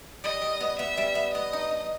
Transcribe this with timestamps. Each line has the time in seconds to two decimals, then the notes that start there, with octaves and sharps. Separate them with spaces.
0.24 G3 D#5
0.42 G3
0.60 B3
0.79 B3 E5
0.97 G3
1.15 B3
1.34 B3 D#5
1.53 D#4
1.71 D#4